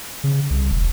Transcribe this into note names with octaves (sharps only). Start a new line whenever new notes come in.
C#3
C2
E1